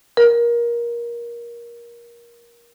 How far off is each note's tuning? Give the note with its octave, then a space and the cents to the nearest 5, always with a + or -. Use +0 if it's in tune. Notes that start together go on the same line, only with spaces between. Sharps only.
A#4 +20